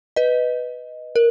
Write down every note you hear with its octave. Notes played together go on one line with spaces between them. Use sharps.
B4 D#5
A#4